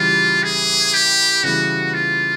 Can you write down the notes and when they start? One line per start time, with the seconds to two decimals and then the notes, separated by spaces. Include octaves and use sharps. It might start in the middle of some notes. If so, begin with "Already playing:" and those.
Already playing: C#3 E3 G3 F4
0.44 G#4
0.94 G4
1.44 C#3 E3 G3 B3 F#4
1.94 F4